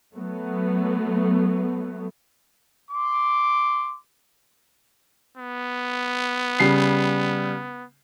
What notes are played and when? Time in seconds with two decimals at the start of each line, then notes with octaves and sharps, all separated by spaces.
0.15 F#3 A3 B3
2.91 C6 D6
5.37 B3
6.60 C#3 G3 C7